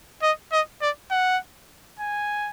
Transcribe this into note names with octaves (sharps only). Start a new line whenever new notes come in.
D#5
D#5
D5
F#5
G#5